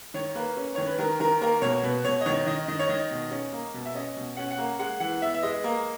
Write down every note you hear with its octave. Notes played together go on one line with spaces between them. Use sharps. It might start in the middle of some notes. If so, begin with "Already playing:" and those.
D#3 C#5
A#3 B4
C#4
D#3 C#5
B4
D#3 A#4
D#3 A#4
A#3 A#4
B2 C#5
B2 B4
B2 C#5
D#5
D#3 C#5
D#3 D#5
D#3 D#5
C#5
D#3 D#5
B2
C#4
A#3
B2
E5
C#4 D#5
B2
C#4 F#5
F#5
A#3
G#3 F#5
E3 F#5
B3 E5
E5
G#3 D#5
A#3